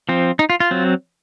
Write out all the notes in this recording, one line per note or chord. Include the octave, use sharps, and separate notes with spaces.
F3 C4
D#4
F4
F4
F#3 C4